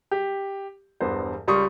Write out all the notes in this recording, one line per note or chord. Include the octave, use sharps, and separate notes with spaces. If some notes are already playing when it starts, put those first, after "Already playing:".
G4
E1 E2 G2 B4 C5
C#2 G3 C6 C#6 D#6